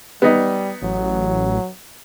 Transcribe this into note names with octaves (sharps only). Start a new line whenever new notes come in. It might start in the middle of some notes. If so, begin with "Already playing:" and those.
G3 B3 D#4
A1 F#3